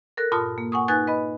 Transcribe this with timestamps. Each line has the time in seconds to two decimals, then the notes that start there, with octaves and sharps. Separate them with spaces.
0.17 A4 A#4 F#6
0.32 G2 A#2 F4 A5 C6 D#6
0.58 A#3
0.72 F#5 G#5 C#6 D#6
0.88 D#4 B4 G#5 F#6 G#6 A6
1.07 B4 D#5 B5